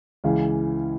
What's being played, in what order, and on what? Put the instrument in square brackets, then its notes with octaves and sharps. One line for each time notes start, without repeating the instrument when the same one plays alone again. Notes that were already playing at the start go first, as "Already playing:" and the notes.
[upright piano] C#2 C#3 E3 F5